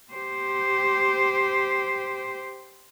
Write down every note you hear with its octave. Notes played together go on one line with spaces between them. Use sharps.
G4 C5